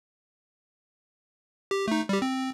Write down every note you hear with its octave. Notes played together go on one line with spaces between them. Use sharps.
G4
A3 D#4
G3 G4
C4